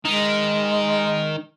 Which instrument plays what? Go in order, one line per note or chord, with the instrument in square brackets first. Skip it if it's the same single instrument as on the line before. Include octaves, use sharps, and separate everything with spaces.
[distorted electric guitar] D#3 [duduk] G#3